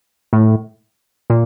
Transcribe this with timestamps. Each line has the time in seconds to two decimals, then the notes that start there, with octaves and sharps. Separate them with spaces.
0.33 A2
1.30 A#2